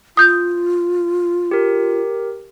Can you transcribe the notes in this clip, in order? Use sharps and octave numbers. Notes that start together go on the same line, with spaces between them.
F4 D#6 G6
G4 A#4